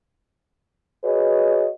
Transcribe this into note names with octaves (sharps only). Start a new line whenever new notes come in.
F#4 G#4 B4 C#5 D#5